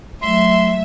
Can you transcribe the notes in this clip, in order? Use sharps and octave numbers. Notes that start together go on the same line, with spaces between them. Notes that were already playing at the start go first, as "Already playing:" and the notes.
F#3 A3 E5 C6